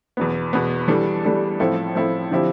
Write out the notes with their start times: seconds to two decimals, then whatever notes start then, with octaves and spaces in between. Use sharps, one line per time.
0.17 E2 B2 B3
0.53 E2 B2 B3
0.88 E3 G3 D4 A4
1.24 E3 G3 D4 A4
1.60 A2 F3 C4 E4 A4
1.95 A2 F3 C4 E4 A4
2.31 D3 F3 C4 E4 G4